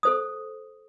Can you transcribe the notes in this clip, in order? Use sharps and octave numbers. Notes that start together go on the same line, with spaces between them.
A4 C5 D#6